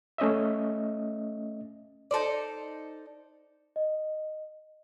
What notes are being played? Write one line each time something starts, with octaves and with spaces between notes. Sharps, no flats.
A3 C#4 D#5 E5
D#4 A4 C5 D5
D#5